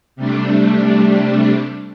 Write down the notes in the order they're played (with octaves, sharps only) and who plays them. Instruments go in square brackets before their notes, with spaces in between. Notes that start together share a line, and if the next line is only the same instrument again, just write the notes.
[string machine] C3 G3 A3 D4